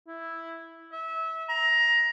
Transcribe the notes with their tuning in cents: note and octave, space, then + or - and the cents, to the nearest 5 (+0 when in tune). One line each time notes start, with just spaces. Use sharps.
E4 +0
E5 -25
A#5 +15